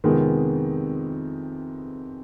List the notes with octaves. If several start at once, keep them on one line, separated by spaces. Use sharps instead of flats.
F2 C3 D#3 G#3 B3